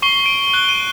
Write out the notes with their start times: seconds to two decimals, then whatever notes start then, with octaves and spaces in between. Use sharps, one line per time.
0.02 C#6 C7 G7
0.26 D7
0.54 F#6 G7
0.69 D#7